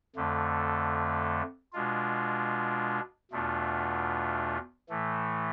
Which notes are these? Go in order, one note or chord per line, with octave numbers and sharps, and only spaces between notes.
F2 D3 A3
B2 G#3 D4 F4
E2 B2 A3 D4 F4
A2 E3 A3